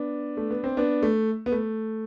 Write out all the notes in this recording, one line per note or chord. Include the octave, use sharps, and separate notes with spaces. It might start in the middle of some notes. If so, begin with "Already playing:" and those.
Already playing: B3 D4
A3
B3
C4
B3 D4
A3
B3
A3